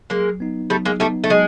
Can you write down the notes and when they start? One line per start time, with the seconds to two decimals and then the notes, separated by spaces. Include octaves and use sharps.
0.10 F#3 G#3 A#3
0.40 B3 D#4
0.70 F#3 G3 A3
0.85 G#3 A#3
1.00 G3 A3 B3 D#4
1.24 A3
1.30 F#3 G#3